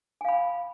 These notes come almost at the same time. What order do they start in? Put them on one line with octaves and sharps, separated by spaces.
G#5 F5 B5